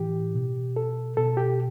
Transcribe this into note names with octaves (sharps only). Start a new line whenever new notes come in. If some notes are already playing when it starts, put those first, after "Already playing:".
Already playing: A2 E3 G4
B2
A4
B2 A4
G4